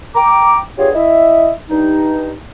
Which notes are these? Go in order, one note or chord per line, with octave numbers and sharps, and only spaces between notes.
G5 A#5 D6
B3 D4 F4 G4 G#4 C#5
E4 D#5 E5
G2 D#4